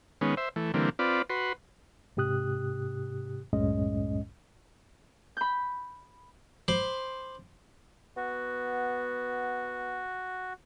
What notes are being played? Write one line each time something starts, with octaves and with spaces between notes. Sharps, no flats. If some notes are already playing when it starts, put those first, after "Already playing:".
D#3 G#3 B3 C#4
C5 E5
E3 A3
D3 E3 G3 A#3 C4
C4 F4 B4 D5
F#4 B4 C6
G#2 C3 G4 D#6 F#6
C2 F#2 A2 G#3 C#4 D#5
B5 G6
C5 B5 C6 D6
B3 F#4